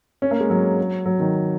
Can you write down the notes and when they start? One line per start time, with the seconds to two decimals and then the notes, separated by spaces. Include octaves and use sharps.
0.22 C#4
0.31 A#3
0.40 G#3
0.50 F#3
1.06 F#3
1.20 D#3